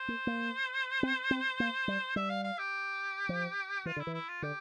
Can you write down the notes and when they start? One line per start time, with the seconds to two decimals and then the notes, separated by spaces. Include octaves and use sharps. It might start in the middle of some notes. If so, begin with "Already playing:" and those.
Already playing: C5
0.08 A#3
0.27 A#3
1.03 C4
1.31 C4
1.60 A#3
1.88 G3
2.16 G3 E5
2.30 F5
2.44 F5
2.59 G4
3.29 F3
3.85 E3 F4
3.96 D3 E4
4.07 E3
4.14 E4
4.28 F4
4.42 D3 G4